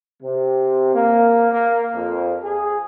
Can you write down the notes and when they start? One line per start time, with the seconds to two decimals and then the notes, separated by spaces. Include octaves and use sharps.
0.22 C3
0.95 A#3
1.52 A#3
1.95 F2
2.43 G#4